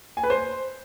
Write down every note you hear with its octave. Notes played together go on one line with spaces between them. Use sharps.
G#5
B4
C5